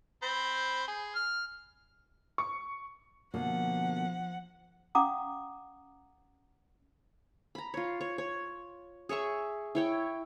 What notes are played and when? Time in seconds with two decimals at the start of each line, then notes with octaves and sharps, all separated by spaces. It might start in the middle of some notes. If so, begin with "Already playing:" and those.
0.23 C4 C5 B5
0.88 G#4
1.15 F6
2.38 C#6
3.34 B2 D3 F3 A#3 F#5
4.95 C#4 F5 F#5 A#5 D6 D#6
7.55 A#5 B5
7.74 F4 C#5
8.01 C#5
8.18 C#5
9.09 G#4 C#5 E5 C#6
9.75 E4 C#5 G5